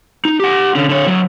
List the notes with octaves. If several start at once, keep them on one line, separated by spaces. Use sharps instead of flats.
D#4
G4 F#5
D3 C#4
D3 C#5
D3 F#3